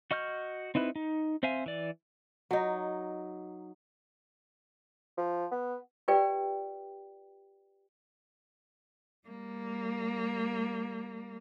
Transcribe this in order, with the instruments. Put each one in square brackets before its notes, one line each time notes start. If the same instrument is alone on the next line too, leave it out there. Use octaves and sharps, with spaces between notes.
[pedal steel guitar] F#4 D#5 C#6 F6 G6
C4 D#4 E4 B4
D#4
C4 C5 E5 F5 G#5
E3 D5
[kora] F#3 D#4
[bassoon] F3
B3
[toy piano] F4 G4 B4 D5 G5
[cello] G3 A#3